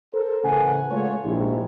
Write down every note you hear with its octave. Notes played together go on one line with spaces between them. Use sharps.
A4 A#4 C5
A1 C#3 A3 B4 F#5 G#5
G#3 A3 F4 G#4 C#5
A#1 G#2 E4 G4